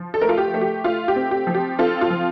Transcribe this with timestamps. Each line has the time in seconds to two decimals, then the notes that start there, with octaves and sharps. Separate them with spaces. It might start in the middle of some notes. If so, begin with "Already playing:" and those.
Already playing: F3
0.14 A4
0.21 A3 A#4
0.29 F4 A4
0.38 G4
0.54 A3
0.61 G4
0.84 A3 F4
1.08 G4
1.16 C4
1.31 G4
1.47 F3
1.54 G4
1.79 C4 F4 A4
2.01 F4
2.10 F3